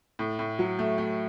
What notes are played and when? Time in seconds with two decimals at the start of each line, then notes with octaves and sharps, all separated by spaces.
0.19 A2
0.39 A2
0.59 F#3
0.79 A3
0.98 A3